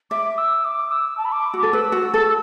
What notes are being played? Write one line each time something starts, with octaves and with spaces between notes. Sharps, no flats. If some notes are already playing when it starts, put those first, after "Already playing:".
E5 D6
E6
D6
E6
A5
B5
D6
F#4
A4
B4 E6
F#4
A4